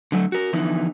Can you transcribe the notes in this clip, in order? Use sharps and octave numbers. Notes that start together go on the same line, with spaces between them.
D3 F#3 A3
F#4 A#4
D3 E3 F3 B3 D#4 E4